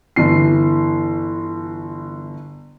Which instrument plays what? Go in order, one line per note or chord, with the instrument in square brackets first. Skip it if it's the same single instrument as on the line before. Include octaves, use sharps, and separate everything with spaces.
[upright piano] G1 E3 C7